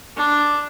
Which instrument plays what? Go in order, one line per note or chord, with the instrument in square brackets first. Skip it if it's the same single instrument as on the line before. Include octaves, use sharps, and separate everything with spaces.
[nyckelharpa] D4